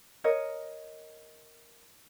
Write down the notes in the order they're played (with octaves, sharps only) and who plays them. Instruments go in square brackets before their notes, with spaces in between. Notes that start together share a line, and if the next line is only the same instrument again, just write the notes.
[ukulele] A#4 C#5 D#5